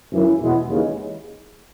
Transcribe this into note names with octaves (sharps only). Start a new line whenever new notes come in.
G#1 F#2 C#3 E3
E2 B2 G#3 B3 E4
D#2 C#3 E3 G#3